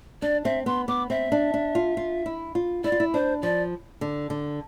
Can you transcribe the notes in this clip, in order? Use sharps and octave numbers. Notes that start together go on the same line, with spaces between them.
D4 D5
C4 E5
B3 C6
B3 D6
C4 E5
D4
D4
F4
F4
E4
F4
E4 D5
F4
E4
D4 C5
F3 D5
D3
D3